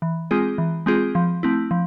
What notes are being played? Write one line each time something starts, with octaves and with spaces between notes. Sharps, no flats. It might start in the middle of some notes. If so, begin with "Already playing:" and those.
E3
G#3 C4 F4 G#4
E3
G#3 C4 F4 G#4
F3
A3 C4 E4
F3